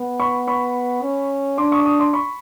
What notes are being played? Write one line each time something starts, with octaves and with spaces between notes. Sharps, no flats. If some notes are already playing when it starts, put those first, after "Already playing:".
Already playing: B3
B5 C#6
B5 C#6
C#4
D4 C6 D6
C#6 D#6
D6
C#6 D#6
C6 D6
B5 C#6